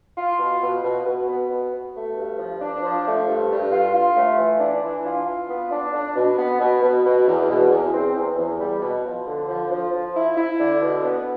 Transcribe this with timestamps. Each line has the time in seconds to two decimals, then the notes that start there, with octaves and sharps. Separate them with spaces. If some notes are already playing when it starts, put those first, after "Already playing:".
0.17 F4
0.39 B2
0.62 B2
0.83 B2
1.05 B2
1.29 B3
1.49 B2
1.73 B2
1.94 A3
2.16 G2
2.38 F3
2.61 D4
2.83 F3
3.06 A3
3.28 G2
3.50 G2
3.72 F4
3.94 F4
4.17 A3
4.38 E3
4.60 D4
4.82 E3
5.05 F4
5.26 F4
5.49 B3
5.71 D4
5.93 D4
6.16 B2
6.38 B3
6.60 B2
6.82 B2
7.04 B2
7.27 E2
7.49 B2
7.71 E2
7.93 C4
8.15 E2
8.38 E2
8.60 G3
8.81 B2
9.04 F3
9.27 D3
9.48 F3
9.71 F3
9.92 F3
10.15 E4
10.36 E4
10.59 D3
10.82 B2
11.03 B3